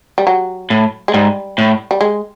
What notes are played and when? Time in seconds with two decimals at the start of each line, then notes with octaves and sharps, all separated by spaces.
0.18 G3
0.27 F#3
0.70 A2
1.08 G#3
1.14 G#2 G3
1.58 A2
1.91 G3
2.01 G#3